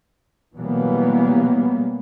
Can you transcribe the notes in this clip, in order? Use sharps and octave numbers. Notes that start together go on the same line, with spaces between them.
B2 E3 F#3 G3 A#3 B3